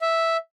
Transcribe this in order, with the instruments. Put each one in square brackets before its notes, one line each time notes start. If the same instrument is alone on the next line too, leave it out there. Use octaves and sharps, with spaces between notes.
[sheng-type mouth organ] E5